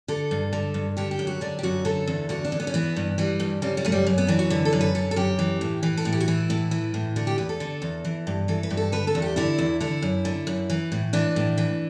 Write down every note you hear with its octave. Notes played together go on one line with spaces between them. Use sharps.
D3 A4
G2
D3
G2
D3 G4
G4
F#2
F#4
D3 D4
G4
F#2 F#4
D3 A4
E2
D3 F#4
D4
E2
B3
C#4
E3 B3
G2
E3 G3
G2
C#3 G3
G3
F#2 A3
G3
F#2
B3
E3 D4
F#4
D3 B4
A4
F#2
B4
D3 A4
A4
F#2 G4
E3
A2
E3
A4
A2
G4
F#4
E3 E4
A2
E3
A2
D3 F#4
G4
E2 B4
A4
D3
E2
E3
G2
E3 A4
B4
G2
A4
D3 B4
A4
E2
G4
D3 E4
E2
D3 E4
F#2
D3
F#2
E3
A2
E3 D4
A2
E3